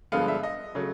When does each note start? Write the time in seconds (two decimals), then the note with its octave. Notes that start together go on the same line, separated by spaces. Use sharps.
0.12 G2 D3 F3 G#3 B3 F5
0.28 E5
0.43 D#5
0.75 C#3 F#3 A3